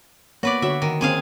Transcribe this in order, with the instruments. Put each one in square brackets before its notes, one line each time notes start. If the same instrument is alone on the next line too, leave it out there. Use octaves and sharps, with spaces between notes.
[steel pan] A#3 B3 C#5 [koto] F#4 B4 D5
[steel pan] D3 F#4 C#5 [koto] E5
[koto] D#3
[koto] G#3 G#4 F5 [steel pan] A#3 C4 C#4